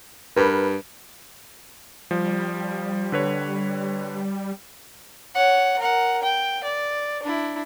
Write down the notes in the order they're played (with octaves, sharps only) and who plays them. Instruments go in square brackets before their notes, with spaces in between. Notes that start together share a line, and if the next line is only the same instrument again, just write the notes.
[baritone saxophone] G2 [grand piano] A#4 B4
[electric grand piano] F3 [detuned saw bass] G3
[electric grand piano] D3 B4 C#5
[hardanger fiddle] C#5 F#5
A#4 F#5
G5
D5
D4 E4